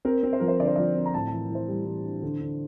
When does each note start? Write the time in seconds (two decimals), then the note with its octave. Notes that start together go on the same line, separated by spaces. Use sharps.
0.05 C4 A#4
0.23 C4
0.33 C5
0.40 F3 A#4
0.48 C5
0.60 D3 D5
0.67 C5
0.76 F3 D5
0.96 C4
1.06 A#5
1.14 A2 A5
1.28 E3 A5
1.50 E3
1.55 C5
1.68 G3
1.86 E3
2.05 D4
2.23 D3
2.41 D3